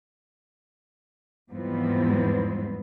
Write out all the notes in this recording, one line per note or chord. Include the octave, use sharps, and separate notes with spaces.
E2 G#2 F3 G3 B3 C4